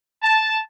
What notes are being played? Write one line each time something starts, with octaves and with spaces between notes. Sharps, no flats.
A5